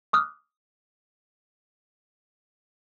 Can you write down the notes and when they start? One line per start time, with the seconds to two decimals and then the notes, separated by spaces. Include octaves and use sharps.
0.13 D6 D#6 F6 F#6